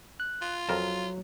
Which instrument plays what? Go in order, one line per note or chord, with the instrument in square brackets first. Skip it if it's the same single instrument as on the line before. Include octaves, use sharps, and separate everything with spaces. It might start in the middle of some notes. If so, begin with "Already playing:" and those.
[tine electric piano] F#6
[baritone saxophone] F4
[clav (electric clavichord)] F2 A#4 A5 [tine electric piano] F#3